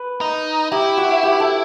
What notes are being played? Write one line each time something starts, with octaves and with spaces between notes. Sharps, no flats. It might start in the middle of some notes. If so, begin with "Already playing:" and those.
Already playing: B4
D#4
E4 G4
F#4
G4
A4